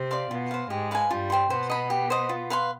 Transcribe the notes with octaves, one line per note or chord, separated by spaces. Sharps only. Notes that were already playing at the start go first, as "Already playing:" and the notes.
Already playing: C3 C4
D5 F5 C6
B2 B3 F4
C5 F5
G#2 G#3 G4
B4 F5 G#5
G2 G3 F4
C5 G5 C6
B2 B3 C5
D#5 B5
G4
C5 D#5
F4
B4 F5 C6